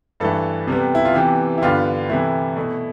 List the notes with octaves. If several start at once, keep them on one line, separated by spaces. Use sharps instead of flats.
G2 E3 A3 A4
C3 G3 B3
E4
F4
C3 E3 B3 G4
E4
G2 D3 G3 B3 F4
C3 E3 A3 E4
B2 A3